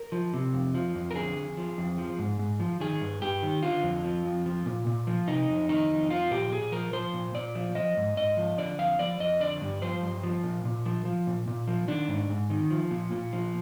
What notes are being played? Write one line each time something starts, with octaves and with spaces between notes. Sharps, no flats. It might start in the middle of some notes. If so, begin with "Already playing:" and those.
Already playing: A#4
F3
C3
F2
F3
F2
A#4
D3 G#4
F2
F3
F2
F3
G#2
G#2
F3
D#3 G#4
G2
G2 G4
D#3
D3 F4
F2
F3
F2
F3
A#2
A#2
F3
C3 D#4
F2
D#3 D#4
F2
F3 F4
A#2 G4
A#2 G#4
F3 A#4
F3 C5
A#2
A#2 D5
F3
F3 D#5
G#2
G#2 D#5
F3
D3 D5
F2 F5
F3 D5
F2 D#5
D3 D5
G2
F3 C5
G2
F3
A#2
A#2
F3
F3
A#2
A#2
F3
D#3 D4
G#2
G#2
D#3
F3
A#2
A#2
F3